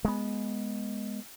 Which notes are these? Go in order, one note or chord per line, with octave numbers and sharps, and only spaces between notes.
G#3 B3